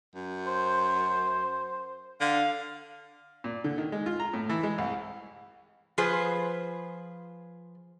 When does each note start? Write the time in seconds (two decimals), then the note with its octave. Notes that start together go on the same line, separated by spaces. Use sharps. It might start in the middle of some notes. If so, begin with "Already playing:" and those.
0.15 F#2
0.47 C5
2.21 D3 F5
3.44 A#2
3.64 D3
3.78 D#3
3.92 G#3
4.06 F4
4.20 A#5
4.34 A2
4.49 E3
4.63 G#3
4.78 C2
5.98 F3 F4 G#4 B4 C5